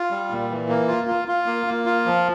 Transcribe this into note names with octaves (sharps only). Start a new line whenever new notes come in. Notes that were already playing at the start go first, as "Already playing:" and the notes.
Already playing: F4
G3
A#2
E3
A#3
F4
F4
F4
A#3
A#3
F4
F3